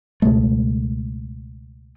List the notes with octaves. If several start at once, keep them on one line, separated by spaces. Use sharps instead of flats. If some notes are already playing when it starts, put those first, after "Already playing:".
C#2 B2 G#3 A3